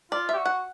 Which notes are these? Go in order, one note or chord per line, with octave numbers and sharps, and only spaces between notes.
F4 D5
G4 E5
F#4
F#5